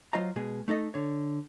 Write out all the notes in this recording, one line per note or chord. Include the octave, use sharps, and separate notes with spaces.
F#3 F4 C5 D#5 A#5
B2 G#3 G#4
A3 D#4 A4 D#5
D3 C#5